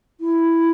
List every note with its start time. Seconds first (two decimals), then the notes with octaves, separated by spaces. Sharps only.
0.21 E4